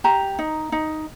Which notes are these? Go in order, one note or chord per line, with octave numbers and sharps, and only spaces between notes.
G4 A#5
D#4
D#4